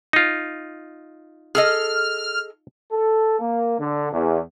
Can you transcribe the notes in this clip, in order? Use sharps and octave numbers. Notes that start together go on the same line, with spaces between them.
D#4 F4
G#4 A4 D#5 F6
A4
A#3
D3
E2